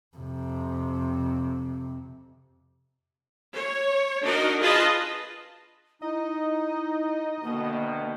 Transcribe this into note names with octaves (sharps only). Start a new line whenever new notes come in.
F2 C3
C#5
D4 D#4 F#4 A#4 D#5
F4 G#4 B4 D#5 A5
D#4 E4 D#5
D2 B2 D#3 A#3